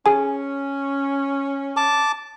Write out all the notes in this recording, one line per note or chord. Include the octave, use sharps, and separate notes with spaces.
C#4 G#4 G#5
A5 D6